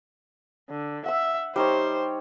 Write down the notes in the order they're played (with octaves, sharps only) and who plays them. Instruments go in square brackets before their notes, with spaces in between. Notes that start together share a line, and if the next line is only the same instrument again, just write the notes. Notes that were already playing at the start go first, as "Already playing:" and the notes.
[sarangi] D3
[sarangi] E5 [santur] F#5 E6
[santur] G3 D#4 C#5 [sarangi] C5